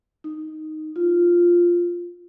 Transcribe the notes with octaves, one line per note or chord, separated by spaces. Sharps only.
D#4
F4